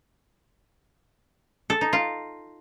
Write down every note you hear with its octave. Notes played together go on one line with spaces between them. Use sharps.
A4
D#4
F4